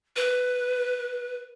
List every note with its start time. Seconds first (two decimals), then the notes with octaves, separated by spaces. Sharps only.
0.16 B4